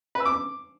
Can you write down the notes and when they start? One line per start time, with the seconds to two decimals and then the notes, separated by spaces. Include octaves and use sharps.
0.15 B4
0.20 E6
0.25 D6